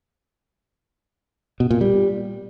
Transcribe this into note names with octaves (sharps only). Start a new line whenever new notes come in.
B2
A#2
G3